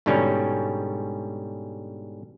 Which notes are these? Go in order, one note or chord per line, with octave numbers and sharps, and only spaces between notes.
G#2 B2 D3 G3 C#4